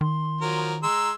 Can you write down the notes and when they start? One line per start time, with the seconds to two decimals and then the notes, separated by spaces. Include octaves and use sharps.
0.01 D#3 C6
0.41 F3 F#3 A#4
0.83 G#3 A#5 C6 E6